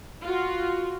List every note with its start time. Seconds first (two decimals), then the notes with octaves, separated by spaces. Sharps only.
0.23 F4 F#4